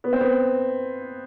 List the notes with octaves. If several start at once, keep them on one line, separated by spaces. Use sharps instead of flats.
B3
C4
B3